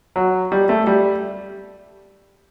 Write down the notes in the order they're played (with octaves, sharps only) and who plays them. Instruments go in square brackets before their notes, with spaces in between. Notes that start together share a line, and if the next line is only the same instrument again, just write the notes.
[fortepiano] F#3
G3
A3
G3